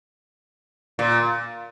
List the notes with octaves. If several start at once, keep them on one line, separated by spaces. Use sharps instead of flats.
A#2